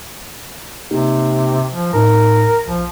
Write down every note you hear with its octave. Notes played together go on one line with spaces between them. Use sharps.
C3 A#3 D#4 G4
F3
A2 D#4 A#4
A#1 F3